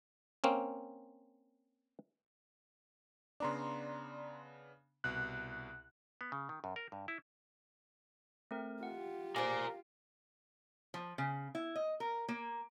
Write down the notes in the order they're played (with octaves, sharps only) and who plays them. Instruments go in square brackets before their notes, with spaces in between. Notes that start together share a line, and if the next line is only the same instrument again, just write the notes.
[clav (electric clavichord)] A#3 C4 C#4
[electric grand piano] C#3 B3 D4 [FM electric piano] D5 A#5 C6
[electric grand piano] C2 B2 [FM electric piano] F#6
[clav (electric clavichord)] B3
C#3
D#3
F#2
A#4
G2
E4
[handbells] A3 C4 A#4
[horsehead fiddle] F4 G4 [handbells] F#5
[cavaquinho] G#4 C5 [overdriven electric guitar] A#4 D5 [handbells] F5 D7
[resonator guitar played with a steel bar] F3
C#3
E4
D#5
A#4
A#3